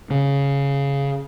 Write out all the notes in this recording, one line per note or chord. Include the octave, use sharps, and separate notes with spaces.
C#3